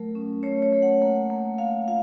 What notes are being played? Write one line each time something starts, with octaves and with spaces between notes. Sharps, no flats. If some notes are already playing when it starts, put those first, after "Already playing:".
Already playing: F#3 A3 A#4
C#4
A3 C#5
C#5
A3
F#5
A#3
A#3
A#3 F5
F4 F5